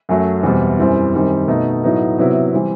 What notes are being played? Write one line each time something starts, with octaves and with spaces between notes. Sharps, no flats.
F#2 F#3 A3
E2 B2 G3 C4
F#2 E3 G3 C4 E4
F#2 D#3 G3 C4
B2 A3 D#4
A2 F#3 B3 D#4
C3 F#3 B3 E4
E3 G3 C4